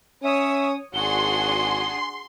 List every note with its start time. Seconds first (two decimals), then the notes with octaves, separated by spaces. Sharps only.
0.24 C#4 C#5 E5 D#6
0.94 G#1 D4 F#4 G#4 C6 G7